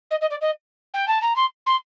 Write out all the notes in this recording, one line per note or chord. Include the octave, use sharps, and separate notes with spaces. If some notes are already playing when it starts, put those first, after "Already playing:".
D#5
D#5
D5
D#5
G5
A5
A#5
C6
C6